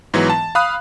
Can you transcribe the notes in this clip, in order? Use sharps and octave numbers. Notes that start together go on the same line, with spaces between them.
G#2 E3 F#3 B3
A5
F5 B5 D#6 F#6